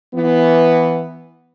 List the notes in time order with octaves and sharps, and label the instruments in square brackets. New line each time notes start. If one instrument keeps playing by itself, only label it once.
[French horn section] E3 B3